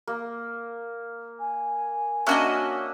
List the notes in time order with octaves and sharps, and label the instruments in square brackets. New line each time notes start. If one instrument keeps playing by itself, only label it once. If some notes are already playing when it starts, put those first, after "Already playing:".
[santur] A#3
[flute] G#5
[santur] A#3 D4 E5 [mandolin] C#4 F#4 D#5